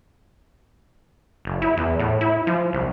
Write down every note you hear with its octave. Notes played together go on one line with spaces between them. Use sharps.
F#1
E4
E2
A2
E4
F3
C2